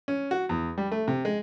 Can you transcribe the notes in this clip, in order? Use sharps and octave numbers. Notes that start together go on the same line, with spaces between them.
C#4
F#4
E2
G3
A3
C3
G#3